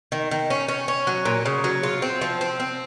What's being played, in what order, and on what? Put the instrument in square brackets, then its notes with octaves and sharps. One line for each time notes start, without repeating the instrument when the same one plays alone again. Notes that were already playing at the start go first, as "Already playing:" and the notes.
[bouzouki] D#3
D#3
C#4
C#4
C#4
F#3
A#2
C#3
F#3
F4
C4
F3
C4
C4